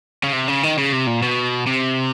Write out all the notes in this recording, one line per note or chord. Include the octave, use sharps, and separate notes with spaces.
C#3
C3
C#3
D#3
C#3
C3
A#2
B2
C3